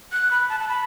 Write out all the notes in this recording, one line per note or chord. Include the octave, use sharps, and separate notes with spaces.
F#6
B5
A5
A5
B5